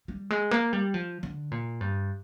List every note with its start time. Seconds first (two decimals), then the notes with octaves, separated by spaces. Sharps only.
0.08 G3
0.30 G#3
0.51 A#3
0.73 G3
0.94 F3
1.23 D3
1.51 A#2
1.81 G2